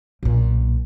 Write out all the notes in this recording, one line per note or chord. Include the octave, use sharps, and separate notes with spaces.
B1 A#2